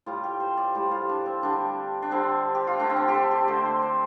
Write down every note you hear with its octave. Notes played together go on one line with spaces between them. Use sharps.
A2 G3 F4
G4
C5
D5
A2 G3 C5
F4
D4
C4
D3 G3 D4
D4
D3 G3 C4
G4
F4
D3 A3 D4
C4
D4
G4
A4
G4
D3 A3 C5
C5
C5